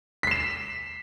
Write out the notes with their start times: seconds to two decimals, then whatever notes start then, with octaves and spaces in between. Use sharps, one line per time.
0.23 B6
0.27 C7
0.31 E7